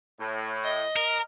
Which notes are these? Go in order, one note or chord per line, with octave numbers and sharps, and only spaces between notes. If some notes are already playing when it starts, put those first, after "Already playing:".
A2
D#5
A#4